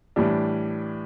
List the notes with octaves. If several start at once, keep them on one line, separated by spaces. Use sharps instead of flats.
A2 E3 G3 D4